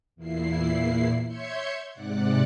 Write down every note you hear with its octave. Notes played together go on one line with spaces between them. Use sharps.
E2 A#2 E4 C7
C#5 E5 C6 G6 G#6 C#7
G#2 C3 D5 F#5 F#6